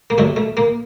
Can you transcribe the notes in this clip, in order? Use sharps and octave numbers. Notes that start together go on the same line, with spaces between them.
A#3
G2 D3 F#3 A3
A3
A#3